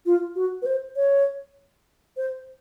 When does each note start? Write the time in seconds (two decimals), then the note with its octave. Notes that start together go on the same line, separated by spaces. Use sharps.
0.06 F4
0.36 F#4
0.62 B4
0.66 C5
0.96 C#5
2.17 C5